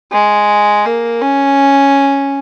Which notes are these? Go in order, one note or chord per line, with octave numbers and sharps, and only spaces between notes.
G#3
A#3
C#4